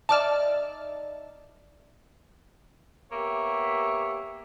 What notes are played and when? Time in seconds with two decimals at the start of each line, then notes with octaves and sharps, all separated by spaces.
0.09 D#4 D5 E5 A5 D6 F6
3.12 A#3 B3 G4 C#5 E5